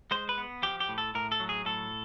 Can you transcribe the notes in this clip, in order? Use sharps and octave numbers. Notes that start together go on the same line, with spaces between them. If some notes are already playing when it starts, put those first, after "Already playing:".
G#3 C5
B4
B3
F3 G4
G4
A2
A4
A2 A#4
A4
F#3
G#4
A2 A4